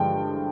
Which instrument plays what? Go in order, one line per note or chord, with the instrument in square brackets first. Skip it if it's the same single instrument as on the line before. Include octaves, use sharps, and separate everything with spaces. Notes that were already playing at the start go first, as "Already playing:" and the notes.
Already playing: [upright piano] G2 D3 F3 G#3 G5